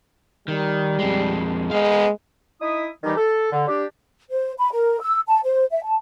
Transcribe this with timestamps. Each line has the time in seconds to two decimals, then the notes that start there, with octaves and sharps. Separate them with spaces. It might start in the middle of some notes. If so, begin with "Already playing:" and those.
0.48 D#3 G3
0.99 F2 G#3
1.71 G#3 B3 F5
2.60 D#4 E4 E5 D#6
3.02 D#3 E3 G3 D#4 G4
3.17 A4
3.51 D3
3.67 D4 G4
4.30 C5
4.58 B5
4.72 A#4
5.01 E6
5.28 A5
5.44 C5
5.70 E5
5.83 A5